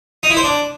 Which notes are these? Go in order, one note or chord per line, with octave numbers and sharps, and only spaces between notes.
D#4
E4
C5
D4